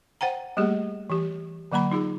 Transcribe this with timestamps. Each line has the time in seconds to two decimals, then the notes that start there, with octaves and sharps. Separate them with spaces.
0.21 C5 F#5 G5 A#5
0.57 G3 A3 A#3 G4 G#4
1.10 E3 G4
1.72 D3 F#3 A#3 A#5 B5
1.92 D#4 F4 G#4